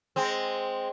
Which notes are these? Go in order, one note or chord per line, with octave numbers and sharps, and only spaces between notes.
G#3 C4